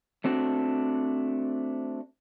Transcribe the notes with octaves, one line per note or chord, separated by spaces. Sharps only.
A3 C4 D4 F#4